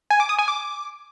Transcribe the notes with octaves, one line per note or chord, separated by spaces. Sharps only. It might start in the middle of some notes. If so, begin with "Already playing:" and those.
G#5
D6
D#6
G#5
D6